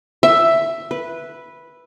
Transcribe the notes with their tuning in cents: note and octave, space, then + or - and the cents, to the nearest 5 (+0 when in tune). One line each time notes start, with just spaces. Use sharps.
E5 +5
B4 -5